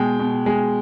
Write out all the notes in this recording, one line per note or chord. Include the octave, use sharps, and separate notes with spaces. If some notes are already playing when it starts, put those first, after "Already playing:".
Already playing: B2 G#3 G5
B2
G#3